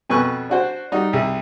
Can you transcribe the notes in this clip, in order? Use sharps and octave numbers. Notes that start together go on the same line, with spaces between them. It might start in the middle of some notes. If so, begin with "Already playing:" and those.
F2 B2 B4 G#5 C#6
D4 F#4 C5
G3 D#4 F#4
C2 G#4